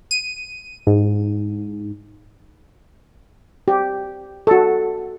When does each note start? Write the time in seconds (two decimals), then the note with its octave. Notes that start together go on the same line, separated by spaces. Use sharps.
0.11 D#7
0.87 G#2
3.68 G4
4.47 F#4 A4